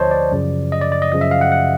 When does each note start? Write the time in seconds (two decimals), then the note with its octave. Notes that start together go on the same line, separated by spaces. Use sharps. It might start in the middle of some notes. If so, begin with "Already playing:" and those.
Already playing: D2 D3 F3 C5 C#5 D#5 A5
0.11 D5
0.32 F#2 C#3 F3
0.72 D#5
0.81 D5
0.92 D5
1.02 D#5
1.12 F#2 C#3 F3 D#5
1.21 E5
1.31 F5
1.41 F#5
1.52 F#5